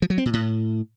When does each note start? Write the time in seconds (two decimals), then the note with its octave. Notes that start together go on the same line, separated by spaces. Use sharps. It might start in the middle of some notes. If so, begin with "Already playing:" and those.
0.02 F3
0.10 F#3
0.18 C4
0.26 A#2
0.33 A2